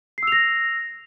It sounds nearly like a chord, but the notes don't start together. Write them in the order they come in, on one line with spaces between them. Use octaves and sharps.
C7 E6 F7 A#6